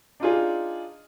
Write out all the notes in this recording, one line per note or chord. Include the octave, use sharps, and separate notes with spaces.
D4 D#4 F4 G#4